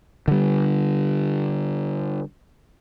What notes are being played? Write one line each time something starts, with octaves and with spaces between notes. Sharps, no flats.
D3 G3